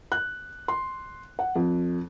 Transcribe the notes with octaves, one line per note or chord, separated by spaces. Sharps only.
F#6
C6
F#5
F2